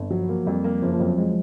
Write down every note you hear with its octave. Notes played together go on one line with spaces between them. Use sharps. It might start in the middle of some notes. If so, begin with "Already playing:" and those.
Already playing: G1
F3 F#3
A#3
F2 G3
A#3
F#1 F3
F3
F2 F#3
G#3